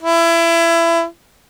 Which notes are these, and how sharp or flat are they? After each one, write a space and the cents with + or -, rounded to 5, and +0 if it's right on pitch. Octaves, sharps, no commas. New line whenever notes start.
E4 +25